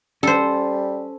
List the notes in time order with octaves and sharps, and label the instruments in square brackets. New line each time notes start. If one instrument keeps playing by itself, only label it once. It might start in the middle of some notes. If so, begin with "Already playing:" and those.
[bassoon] G3 [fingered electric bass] C#4 [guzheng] A4 C5